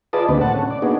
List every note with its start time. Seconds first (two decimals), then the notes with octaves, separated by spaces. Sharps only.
0.13 F4 G#4 B4 D5 D#5 A5
0.28 D2 C3 A#3 C4 D4 B4
0.41 A2 F#5 A5
0.53 C#4
0.70 D5
0.82 A#3 B3 D4 D#4 F#4 G#4